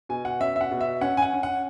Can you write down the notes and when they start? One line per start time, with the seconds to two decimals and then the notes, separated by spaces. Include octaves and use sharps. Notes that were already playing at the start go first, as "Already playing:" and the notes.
0.09 B2 G#5
0.25 F#5
0.40 C#4 E5
0.56 E5
0.61 F#5
0.71 B2
0.81 E5
1.01 C#4 F#5
1.17 G#5
1.22 F#5
1.33 C#4
1.43 F#5